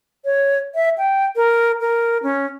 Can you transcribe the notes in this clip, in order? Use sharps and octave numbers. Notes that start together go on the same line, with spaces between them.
C#5
E5
G5
A#4
A#4
C#4